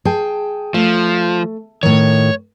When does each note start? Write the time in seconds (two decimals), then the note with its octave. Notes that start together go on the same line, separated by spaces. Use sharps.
0.05 G#4 G5 A5
0.74 F3 A3
1.83 A2 D#3 C#5